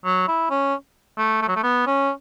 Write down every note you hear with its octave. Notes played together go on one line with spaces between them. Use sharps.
F#3
E4
C#4
A3
A3
F#3
A3
B3
C#4